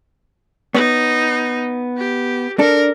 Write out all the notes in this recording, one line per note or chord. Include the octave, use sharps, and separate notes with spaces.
B3 D#4 C#5
G4
D4 A4 A#4